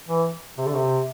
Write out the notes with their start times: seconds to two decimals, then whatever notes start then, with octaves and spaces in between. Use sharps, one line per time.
0.08 E3
0.58 C3
0.66 D3
0.74 C3